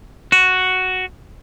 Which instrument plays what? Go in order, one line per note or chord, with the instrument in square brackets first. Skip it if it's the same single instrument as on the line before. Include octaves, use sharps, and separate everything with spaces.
[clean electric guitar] F#4